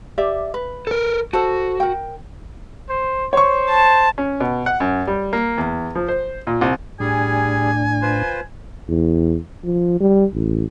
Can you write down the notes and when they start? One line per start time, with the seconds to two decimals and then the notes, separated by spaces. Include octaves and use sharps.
0.18 G4 D5 E5
0.54 B4
0.87 A4 A#4
1.33 F#4 A4 C5 A5
1.80 A#4 G5
2.89 C5
3.33 C5 C#5 C#6
3.69 A5
4.18 C#4
4.41 B2
4.66 F#5
4.80 F#2
5.07 G3
5.33 A#3
5.58 E2
5.95 F3
6.08 C5
6.47 A#2
6.61 C2
7.00 A2 G3 D4 G#4 G#5
8.02 F4 B4 C5
8.89 E2
9.64 F3
10.00 G3
10.34 A1